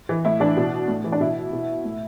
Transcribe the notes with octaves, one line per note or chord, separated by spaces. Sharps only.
E3
A2 E4
E3 D4
B2
A2
E3
D4
B2 E4
B2
A2